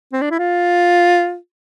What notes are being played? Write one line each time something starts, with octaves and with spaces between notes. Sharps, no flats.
C4
D4
E4
F4